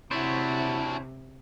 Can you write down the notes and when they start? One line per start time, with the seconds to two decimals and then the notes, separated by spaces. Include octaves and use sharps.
0.11 C3 D4 E4 F#4 C5 C#5 E5